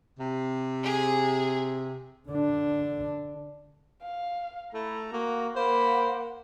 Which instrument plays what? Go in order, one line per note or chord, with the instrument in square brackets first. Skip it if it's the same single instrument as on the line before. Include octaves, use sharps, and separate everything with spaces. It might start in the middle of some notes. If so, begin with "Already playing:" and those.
[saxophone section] C3
[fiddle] G#4
[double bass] D3 D4
[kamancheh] F5
[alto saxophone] A3 [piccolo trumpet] E4 [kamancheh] A#5
[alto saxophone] A#3 [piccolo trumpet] F#4
[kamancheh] A#3 F#5 [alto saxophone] C5 [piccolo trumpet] B5